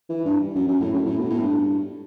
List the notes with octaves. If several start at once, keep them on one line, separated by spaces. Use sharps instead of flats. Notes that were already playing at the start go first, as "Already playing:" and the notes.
E3
G2
F#2
F#2
A2
F#2
A2
B2
A2
G2